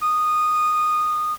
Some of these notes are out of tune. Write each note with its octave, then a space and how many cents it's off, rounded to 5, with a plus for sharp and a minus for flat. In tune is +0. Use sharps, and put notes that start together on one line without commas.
D#6 -15